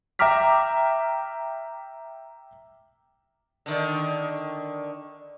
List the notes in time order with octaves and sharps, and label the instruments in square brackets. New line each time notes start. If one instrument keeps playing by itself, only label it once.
[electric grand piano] E5 G5 A#5 D6 F6 B6
[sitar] D3 D#3